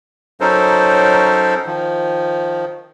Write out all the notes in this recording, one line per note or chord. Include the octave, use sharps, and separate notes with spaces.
F#3 C#4 D#4 A4 A#4 C5
D#3 F3